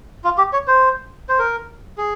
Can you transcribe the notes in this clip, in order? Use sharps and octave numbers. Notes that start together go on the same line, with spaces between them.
F4
G4
C#5
C5
C5
A#4
G#4